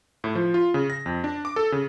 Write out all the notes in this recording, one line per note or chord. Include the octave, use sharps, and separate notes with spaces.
A2
F3
F4
C#3
A#6
F2
D4
D6
A4
C#3